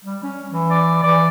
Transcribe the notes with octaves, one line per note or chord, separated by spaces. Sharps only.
G3
C#4
E3
D5
E3 D5